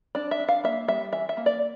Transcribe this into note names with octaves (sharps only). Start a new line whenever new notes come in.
D4 D5
E5
D4
F5
A#3 E5
G3 E5
E3 E5
E5
A#3
D5